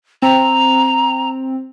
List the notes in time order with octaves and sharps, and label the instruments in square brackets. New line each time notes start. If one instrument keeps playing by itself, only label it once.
[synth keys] C4 [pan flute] A#5